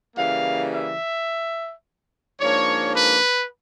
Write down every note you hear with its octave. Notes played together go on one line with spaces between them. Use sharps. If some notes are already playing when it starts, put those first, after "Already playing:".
C#3 E3 G3 A#3 F5
E5
G#2 F3 A#3 D4 C#5
B4